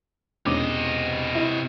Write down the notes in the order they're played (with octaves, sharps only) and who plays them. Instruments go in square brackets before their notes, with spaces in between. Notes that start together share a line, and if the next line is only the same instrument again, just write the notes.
[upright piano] E1 C#4 D6 [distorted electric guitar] C3 D#5
[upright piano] E4